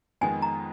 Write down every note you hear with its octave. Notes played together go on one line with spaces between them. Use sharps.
F2 D#3 G#3 B3 D#4 G#5
A#5